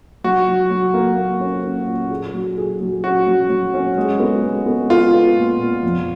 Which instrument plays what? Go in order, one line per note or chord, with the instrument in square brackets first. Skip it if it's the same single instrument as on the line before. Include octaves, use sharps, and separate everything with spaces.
[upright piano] F#3 [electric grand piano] F#4
[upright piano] F#3
F#3
A#3
A#3
C#4
C#4
A#2
G#4
F#3
G#4
F#3
[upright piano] C#4 [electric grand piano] F#4
[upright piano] F#3
F#3
C#4
G#3
B3
G#3
B3
[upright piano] B3 [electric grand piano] F4
[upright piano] B3
A#2
A#2
F2